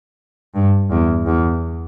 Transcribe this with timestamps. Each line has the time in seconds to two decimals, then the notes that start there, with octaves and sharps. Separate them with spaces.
0.55 G2
0.91 E2
1.26 E2